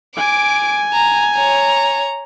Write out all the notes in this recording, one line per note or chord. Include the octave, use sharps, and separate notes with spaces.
G#5 D6 D7
A#5
C#5 A#5